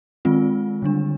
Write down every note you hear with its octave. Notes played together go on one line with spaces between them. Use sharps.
D#3 G#3 C4 F4
D3 G3 D4